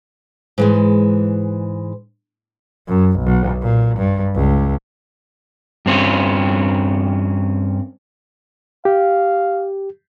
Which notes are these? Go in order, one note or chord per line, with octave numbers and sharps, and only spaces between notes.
G#2 E3 G#3
F#2
B1
A#2
G2
C#2
G2 C4 C#4
G4 F5